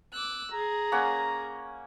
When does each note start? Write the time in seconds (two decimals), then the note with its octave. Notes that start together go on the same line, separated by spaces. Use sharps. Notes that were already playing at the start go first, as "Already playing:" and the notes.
0.13 D6 E6 F#6
0.52 G#4 A#5
0.92 A#3 C#4 F#5